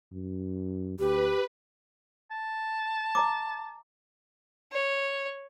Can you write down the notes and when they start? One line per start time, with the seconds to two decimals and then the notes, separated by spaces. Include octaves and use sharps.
0.12 F#2
0.99 D2 G4 B4
2.31 A5
3.15 D#5 A#5 D6
4.72 C#5